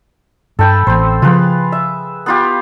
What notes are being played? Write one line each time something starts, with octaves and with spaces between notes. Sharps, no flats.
G2 A4 G5 B5
A1 C4 C5
C#3 F3 F4 G#4 B4
E5
B3 F4 G4